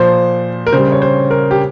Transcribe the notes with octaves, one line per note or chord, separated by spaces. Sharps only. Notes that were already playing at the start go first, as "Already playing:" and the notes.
Already playing: A#2 F3 C5
A#4
C#3 G3 C5
C#5
C5
A#4
G4